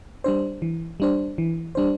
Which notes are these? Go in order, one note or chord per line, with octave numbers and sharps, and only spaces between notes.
G3 D4 C5
E3
G3 D4 C5
E3
G3 D4 C5